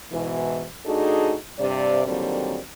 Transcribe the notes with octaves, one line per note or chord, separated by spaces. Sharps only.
G#2 B2 E3
A2 D4 D#4 F#4 G#4 A4
G2 C3 D5
A#2 D3 D#3 F#3 G3 C4